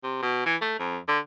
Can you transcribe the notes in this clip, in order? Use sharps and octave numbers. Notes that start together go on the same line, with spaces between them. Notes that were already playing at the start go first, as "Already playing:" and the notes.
C3
B2
E3
A3
F2
D3